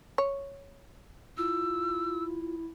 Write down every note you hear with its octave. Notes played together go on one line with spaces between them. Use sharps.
C#5
E4 F4 E6